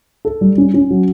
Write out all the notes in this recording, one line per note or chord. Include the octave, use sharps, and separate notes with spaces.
A4
G3
C#4
C#4
F#3